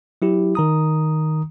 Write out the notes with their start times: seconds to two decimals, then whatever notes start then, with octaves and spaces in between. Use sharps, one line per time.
0.22 F#3 E4 G4
0.55 D#3 A#5 D#6